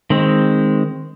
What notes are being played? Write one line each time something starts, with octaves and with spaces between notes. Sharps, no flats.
D#3 G#3 C4